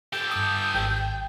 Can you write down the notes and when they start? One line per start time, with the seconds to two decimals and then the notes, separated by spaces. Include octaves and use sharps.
0.13 G4 A4 G6
0.31 G2 D#6
0.75 G#1 G5